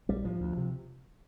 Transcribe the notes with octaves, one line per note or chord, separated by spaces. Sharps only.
A#1 G3
A2 F3
D2
C3